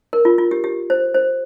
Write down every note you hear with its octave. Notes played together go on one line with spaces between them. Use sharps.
A#4
F4
F4
G4
G4
C5
C5